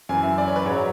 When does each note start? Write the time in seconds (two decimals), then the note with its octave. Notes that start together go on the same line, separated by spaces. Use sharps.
0.09 F#2 E3 G#5
0.23 E5
0.38 D5
0.47 C#5
0.56 B4
0.65 G#2 F#3 C#5